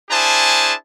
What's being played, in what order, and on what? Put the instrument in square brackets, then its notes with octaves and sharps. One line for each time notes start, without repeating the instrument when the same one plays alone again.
[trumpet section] D4 E4 G#4 C5 G#5 A5